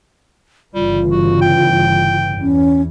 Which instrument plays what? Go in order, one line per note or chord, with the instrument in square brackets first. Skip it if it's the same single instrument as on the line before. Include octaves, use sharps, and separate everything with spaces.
[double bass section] G1 C#3 E3 [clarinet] G3 [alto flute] F4
[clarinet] F#4
G5
[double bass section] E2 [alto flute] C#4